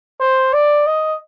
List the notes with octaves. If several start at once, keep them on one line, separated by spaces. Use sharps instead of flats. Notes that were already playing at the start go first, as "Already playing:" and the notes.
C5
D5
D#5